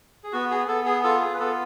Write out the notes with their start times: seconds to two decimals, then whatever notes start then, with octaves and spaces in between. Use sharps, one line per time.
0.24 G#4
0.32 B3 F#4
0.50 G#4
0.68 B3 A4
0.85 G#4
1.04 F4 A4
1.21 G#4
1.34 B4
1.39 B3 A4